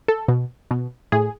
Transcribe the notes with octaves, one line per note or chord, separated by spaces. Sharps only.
A4
B2
B2
A2 G#4